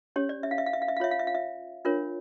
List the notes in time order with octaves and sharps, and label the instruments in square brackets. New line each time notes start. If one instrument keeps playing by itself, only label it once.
[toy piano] C#4 G4 C#5
D5
E5
F5
E5
F5
E5
F5
E5
F5
F4 C#5 E5
F5
E5
F5
E5
D4 F4 A#4 C#5